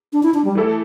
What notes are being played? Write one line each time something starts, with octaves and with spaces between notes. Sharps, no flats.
D4
E4
D4
G3
E3 A3 E4 A4